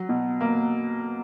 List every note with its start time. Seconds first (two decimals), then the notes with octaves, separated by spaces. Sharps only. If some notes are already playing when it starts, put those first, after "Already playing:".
Already playing: F#3
0.09 B2
0.41 A#3